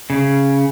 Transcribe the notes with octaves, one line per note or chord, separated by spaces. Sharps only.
C#3